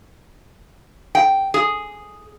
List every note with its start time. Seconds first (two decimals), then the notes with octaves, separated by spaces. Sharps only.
1.15 G5
1.54 G#4